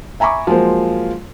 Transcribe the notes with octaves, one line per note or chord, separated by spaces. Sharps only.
E5 G#5 A#5 B5 C#6 D6
F3 F#3 G#3 A#3 C5